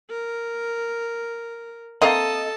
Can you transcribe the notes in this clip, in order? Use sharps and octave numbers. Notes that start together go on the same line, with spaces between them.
A#4
A#3 C4 A4 D#5 F5 A5